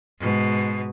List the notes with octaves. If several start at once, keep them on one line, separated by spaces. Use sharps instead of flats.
G#2 B2